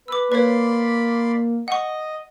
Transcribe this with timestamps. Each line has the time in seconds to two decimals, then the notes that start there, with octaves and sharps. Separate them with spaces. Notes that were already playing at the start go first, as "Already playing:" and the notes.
0.08 B4 D6 E6
0.32 A#3 B4 C#5 D5 B5 C6
1.68 D#5 F#5 C#6